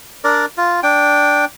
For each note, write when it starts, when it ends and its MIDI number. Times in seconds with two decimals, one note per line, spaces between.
0.24 0.46 62
0.24 0.46 70
0.24 0.46 74
0.57 0.80 65
0.83 1.45 62
0.83 1.45 79